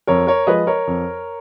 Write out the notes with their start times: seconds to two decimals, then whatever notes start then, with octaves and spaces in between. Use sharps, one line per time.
0.07 F2 A#4 C#5
0.27 A#4 C#5
0.47 F3 G#3 B4 D#5
0.67 A#4 C#5
0.87 F2